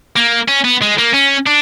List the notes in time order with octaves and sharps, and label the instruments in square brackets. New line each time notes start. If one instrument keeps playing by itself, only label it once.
[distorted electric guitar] A#3
C#4
B3
G#3
A#3
C#4
D4